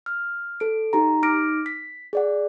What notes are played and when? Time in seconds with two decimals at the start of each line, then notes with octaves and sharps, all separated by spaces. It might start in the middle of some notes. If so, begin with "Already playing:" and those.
0.06 F6
0.60 A4 D7
0.93 D#4 G4 A#5
1.22 D#4 D6 F6 A#6 D7
1.66 B6
2.13 G#4 D5 F#5